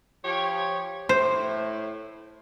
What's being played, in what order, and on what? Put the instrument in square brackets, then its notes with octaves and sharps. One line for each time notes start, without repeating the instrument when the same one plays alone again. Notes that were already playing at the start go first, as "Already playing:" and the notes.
[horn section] F3 G4 C#5
[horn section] A2 [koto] C5